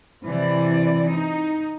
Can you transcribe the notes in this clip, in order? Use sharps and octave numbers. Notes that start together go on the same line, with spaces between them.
C3 E3 D5
D#4